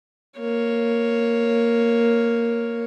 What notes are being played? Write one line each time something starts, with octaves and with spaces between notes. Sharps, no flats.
A#3 C#5